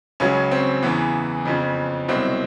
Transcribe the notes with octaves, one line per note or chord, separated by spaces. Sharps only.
C#2 C#3 F#3 C#4
C4
E2 C#3 E3 B3
F2 C#3 F3
C2 B2 F#3 C4